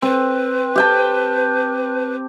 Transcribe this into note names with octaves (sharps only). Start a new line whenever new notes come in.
C4 B4
G4 G5 A5